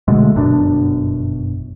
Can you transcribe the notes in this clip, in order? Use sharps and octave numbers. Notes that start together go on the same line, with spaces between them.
B2 D3 G#3 A3
G1 F#2 B2 D4